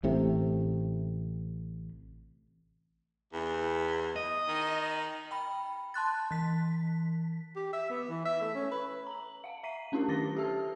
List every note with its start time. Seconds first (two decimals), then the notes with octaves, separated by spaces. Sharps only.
0.03 A1 A2 C3
3.33 E2
4.16 D#5
4.48 D#3
5.31 G5 B5
5.94 A5 C6 F#6 A6
6.31 E3 B6
7.56 G4
7.73 E5
7.90 B3
8.09 E3
8.25 E5
8.41 A3
8.55 C#4
8.72 B4
9.07 A#5 F#7
9.44 F5 F#5
9.63 E5 A#5 B6 C7 D#7
9.92 A3 C#4 D4 E4 G4 A#4
10.08 D#3 D6 A6 A#6 G7
10.36 G4 A4 E5 A5 E6 F6